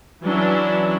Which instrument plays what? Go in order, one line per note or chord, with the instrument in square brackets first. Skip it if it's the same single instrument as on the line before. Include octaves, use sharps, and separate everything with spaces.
[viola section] E3 F#3 C#4 D4 E4